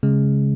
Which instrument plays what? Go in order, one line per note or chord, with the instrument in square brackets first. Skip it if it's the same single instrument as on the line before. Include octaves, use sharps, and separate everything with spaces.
[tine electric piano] C#3 G#3